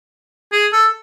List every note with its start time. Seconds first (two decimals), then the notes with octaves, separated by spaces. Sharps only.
0.52 G#4
0.72 A4